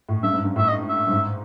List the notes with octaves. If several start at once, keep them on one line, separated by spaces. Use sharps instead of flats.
A2
G2 E5
G#2
G2
A2 E5
D#5
E5
G2
G#2